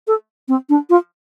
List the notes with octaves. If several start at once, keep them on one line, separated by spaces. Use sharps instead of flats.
A4
C4
D4
F4